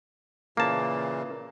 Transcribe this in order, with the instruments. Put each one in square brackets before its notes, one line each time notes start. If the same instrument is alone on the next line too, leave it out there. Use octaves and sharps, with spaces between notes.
[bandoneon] A#2 C#3 E3 [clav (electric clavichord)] A#3 A5